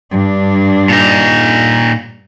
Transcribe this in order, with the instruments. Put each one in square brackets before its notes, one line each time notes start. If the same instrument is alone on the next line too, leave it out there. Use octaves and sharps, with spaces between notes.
[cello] G2 D4
[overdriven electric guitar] A#2 D#4